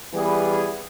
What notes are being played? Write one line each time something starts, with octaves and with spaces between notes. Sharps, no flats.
E3 G3 B3 G#4